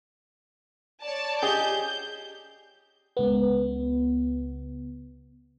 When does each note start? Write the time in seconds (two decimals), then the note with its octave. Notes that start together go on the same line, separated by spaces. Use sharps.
1.02 C#5 D5 A5
1.42 G4 G#4 D#5 G6
3.17 C#2 B3